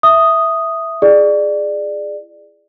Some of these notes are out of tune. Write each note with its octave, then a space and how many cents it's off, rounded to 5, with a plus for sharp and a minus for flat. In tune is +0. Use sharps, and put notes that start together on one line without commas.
E5 +0 D#6 +0
E4 +35 G#4 +0 D5 +20